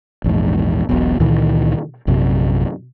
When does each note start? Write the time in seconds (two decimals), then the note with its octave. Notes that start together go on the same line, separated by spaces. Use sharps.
0.24 A#1 E2 G#2
0.89 E1 B1 B2
1.19 C#2 A#2 D#3 E3
2.07 A#1 F#2 C3